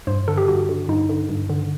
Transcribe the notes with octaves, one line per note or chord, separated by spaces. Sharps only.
G2 C5
D3 A4
G4
G2 F#4
D3
G2 D#4
D3
G2
D3